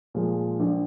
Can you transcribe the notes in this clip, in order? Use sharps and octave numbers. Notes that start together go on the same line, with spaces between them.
A#2 F3 G#3
A#1